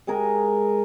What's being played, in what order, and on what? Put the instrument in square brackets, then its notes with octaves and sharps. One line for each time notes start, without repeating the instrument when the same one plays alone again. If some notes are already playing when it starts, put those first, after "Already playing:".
[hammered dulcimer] G#3 G#4 A#4